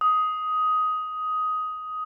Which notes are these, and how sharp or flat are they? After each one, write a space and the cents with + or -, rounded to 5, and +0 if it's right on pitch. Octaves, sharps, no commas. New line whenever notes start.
D#6 +10